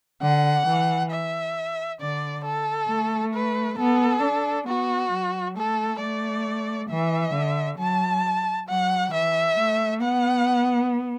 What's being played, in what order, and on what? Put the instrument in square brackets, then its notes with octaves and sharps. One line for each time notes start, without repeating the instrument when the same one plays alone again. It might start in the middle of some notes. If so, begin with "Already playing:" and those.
[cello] D3 [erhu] F#5
[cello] E3
[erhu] E5
[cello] D3 [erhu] D5
[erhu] A4
[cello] A3
[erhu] B4
[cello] B3 [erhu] A4
[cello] D4
[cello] B3 [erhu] F#4
[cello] F#3
[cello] A3 [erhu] A4
[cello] A3 [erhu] D5
[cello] E3 [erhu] E5
[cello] D3
[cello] F#3 [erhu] A5
[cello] F#3 [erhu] F#5
[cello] E3 [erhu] E5
[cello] A3
[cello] B3 [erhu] F#5